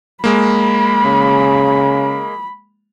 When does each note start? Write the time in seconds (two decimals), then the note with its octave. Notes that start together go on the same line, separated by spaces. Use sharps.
0.24 G#3 A#3 B5
1.05 C#3